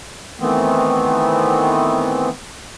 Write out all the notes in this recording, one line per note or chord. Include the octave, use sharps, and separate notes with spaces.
D#3 E3 A3 B3 C4